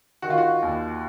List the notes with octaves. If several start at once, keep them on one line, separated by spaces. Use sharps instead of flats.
D#3 F#4
F4
F#4
D#2